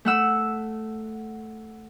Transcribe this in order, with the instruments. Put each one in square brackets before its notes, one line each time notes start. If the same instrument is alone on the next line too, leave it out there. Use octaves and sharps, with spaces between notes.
[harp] A3 F#5 E6